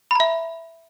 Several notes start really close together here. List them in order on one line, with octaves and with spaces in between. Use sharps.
B5 A#5 E5